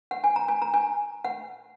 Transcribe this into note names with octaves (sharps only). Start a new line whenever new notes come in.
F#5
G#5
A#5
G#5
A#5
G#5
F#5